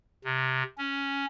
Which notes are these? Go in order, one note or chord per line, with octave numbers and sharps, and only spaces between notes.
C3
C#4